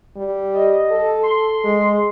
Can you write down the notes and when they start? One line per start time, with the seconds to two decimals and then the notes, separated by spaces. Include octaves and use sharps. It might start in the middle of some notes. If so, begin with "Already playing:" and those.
0.17 G3
0.55 D#5
0.91 A4
1.23 C6
1.64 G#3